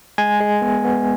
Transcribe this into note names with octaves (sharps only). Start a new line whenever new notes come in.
G#3 G#5
G#3
B3
B3